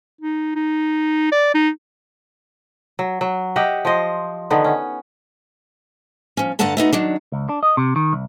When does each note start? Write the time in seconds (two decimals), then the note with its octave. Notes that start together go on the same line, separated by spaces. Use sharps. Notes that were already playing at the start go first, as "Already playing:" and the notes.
0.21 D#4
0.55 D#4
1.32 D5
1.54 D#4
2.99 F#3
3.21 F#3
3.56 G4 D#5 E5 F#5
3.85 F3 C5 D#5
4.50 D3 D#3 B3
4.64 C#4
6.37 F3 C#4
6.59 G2 D3 A4 F#5 A5 A#5
6.77 A3 B3 D#4 F#4
6.93 D#3 F#3 D4
7.32 C#2
7.49 D4
7.63 D#5
7.77 C3
7.96 D#3
8.13 C2